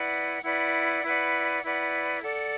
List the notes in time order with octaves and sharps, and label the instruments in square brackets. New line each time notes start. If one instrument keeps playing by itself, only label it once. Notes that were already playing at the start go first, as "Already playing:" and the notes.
Already playing: [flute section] E4 B4 D5 F#5
E4 B4 D5 F#5
E4 B4 D5 F#5
E4 B4 D5 F#5
A4 D5 F#5